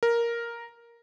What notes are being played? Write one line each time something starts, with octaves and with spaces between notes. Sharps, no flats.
A#4